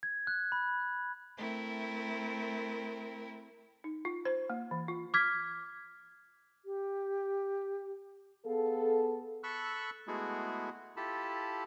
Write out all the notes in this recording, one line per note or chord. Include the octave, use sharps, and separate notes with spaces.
G#6
F#6
B5
A3 C4 E4 A#4
D#4
F4
C5
A#3
E3
F4
D6 F6 G#6 B6
G4
B3 G#4 A4 F5
A4 B5 C#6 E6 F#6
G#3 A3 B3 E4 F#4 G#4
E4 F4 G4 A4 A5 B5